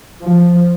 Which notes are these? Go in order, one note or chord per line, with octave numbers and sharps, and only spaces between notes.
F3